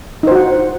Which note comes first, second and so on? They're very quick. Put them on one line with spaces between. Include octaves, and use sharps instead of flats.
D#4 C5 F#4 F#5